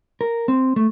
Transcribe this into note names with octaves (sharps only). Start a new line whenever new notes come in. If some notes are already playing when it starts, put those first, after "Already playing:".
A#4
C4
A3